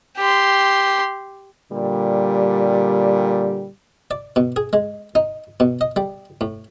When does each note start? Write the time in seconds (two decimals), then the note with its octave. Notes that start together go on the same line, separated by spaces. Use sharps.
0.17 G4 C6
1.72 A#2 D3 G3
4.11 D5
4.36 B2
4.56 G#4
4.73 G#3
5.15 D#4
5.60 B2
5.81 D#5
5.96 G3
6.41 A2